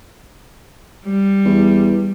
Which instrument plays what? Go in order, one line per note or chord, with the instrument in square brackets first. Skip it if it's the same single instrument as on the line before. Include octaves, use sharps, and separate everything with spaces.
[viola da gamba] G3
[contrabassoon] E2